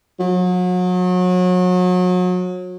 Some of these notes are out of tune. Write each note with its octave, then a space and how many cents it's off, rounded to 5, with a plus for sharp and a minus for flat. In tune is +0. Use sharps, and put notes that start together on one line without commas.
F#3 -35